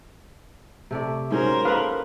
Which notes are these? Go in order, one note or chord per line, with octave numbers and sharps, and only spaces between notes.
C3 A3 D5
G#2 C#4 F#4 A#4 C5
A#3 A4 B4 F5